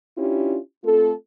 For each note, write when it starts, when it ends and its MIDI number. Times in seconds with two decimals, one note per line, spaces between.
0.17 0.57 61
0.17 0.57 62
0.17 0.57 64
0.17 0.57 65
0.17 0.57 67
0.84 1.12 57
0.84 1.12 60
0.84 1.12 65
0.84 1.12 69